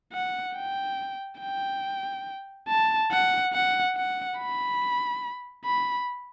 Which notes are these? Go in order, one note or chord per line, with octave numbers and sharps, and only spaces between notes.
F#5
G5
G5
A5
F#5
F#5
F#5
B5
B5